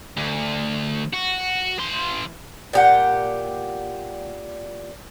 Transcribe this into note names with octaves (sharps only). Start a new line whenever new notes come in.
D2
F#4
E3 C6
A#2 G4 F#5